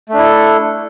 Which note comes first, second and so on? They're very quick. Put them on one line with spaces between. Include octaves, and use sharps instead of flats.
A3 D4 E4 A4